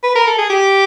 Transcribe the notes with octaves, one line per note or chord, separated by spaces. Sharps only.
B4
A#4
A4
G#4
G4